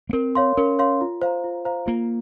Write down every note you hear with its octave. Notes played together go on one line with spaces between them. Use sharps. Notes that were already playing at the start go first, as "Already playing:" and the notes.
A#3
C4 A#4
C#5 F5 C6
C#4 A#4
C#5 F5 C6
F4
C5 F5 A#5
F4
C5 F5 A#5
A#3 F4